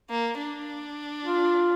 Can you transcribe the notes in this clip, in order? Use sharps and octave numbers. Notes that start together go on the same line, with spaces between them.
A#3
D4
F4